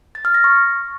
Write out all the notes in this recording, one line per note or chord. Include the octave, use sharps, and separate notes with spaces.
A6
F6
A#6
C#6